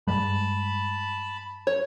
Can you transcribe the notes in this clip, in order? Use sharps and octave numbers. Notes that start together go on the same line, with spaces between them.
G2 G3 G#3 A5 B5
C#5